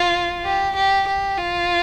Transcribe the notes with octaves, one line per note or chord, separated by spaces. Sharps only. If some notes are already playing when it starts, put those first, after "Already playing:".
Already playing: F4
G4
G4
G4
F4